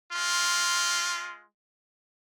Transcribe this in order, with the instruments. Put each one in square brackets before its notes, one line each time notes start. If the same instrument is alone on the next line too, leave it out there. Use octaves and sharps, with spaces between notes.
[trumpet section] G#3 F4